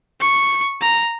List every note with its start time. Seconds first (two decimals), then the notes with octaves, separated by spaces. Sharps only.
0.21 C#6
0.81 A#5